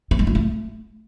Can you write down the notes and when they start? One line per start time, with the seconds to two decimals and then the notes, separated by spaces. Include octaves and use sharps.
0.11 C4
0.19 G#3
0.27 F4
0.35 A3